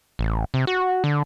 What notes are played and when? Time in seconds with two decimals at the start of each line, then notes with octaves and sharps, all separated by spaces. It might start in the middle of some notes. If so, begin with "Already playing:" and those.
0.19 A1
0.54 C3
0.67 F#4
1.04 D3